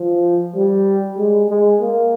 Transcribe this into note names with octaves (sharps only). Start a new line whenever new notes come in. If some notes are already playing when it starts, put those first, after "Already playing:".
Already playing: F3
G3
G#3
G#3
A#3